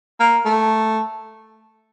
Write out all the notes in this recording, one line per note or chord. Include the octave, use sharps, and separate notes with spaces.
A#3
A3